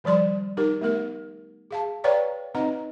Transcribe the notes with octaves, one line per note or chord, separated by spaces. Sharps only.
D#3 F3 G3 D5 C6
D#4 G4 A#4
A3 B3 A#4
G#4 F5 A5
B4 C#5 D5 F5 G5 A#5
C4 D#4 B4 D#5 A#5